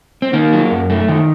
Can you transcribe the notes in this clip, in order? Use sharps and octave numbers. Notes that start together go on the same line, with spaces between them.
C4
D#3 A#3
F#3
F#2
A3
D#3